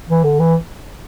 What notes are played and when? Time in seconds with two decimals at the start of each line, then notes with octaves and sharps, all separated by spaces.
0.09 E3
0.24 D3
0.40 E3